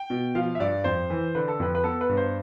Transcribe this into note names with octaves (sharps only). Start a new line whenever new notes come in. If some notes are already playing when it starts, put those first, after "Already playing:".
Already playing: G5
B2
F3 F5
E5
G2 D5
F2 C5
E3
D3 B4
A4
F2 B4
B4
B3 A4
B4
G2
C5